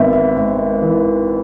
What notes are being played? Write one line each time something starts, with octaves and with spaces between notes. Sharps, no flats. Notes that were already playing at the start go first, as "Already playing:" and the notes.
Already playing: G#1 B3 E5
E5
G#2 E5
E3